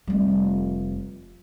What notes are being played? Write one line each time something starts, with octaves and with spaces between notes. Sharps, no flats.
F1 G3